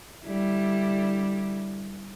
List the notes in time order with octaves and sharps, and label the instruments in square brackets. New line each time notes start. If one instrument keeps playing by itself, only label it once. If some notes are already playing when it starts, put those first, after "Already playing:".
[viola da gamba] D3 G3 E4